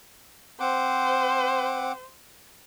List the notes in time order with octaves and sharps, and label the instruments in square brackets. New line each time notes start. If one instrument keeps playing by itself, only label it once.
[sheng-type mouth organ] C4 F#5 D6 [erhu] C5